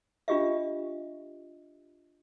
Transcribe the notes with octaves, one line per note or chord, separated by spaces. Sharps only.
D4 F4 G4 D#5 E5